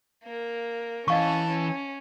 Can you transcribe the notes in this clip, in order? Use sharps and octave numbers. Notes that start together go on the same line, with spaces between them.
A#3 A#4
E3 C#4 D#5 F5 A5 C#6
C#4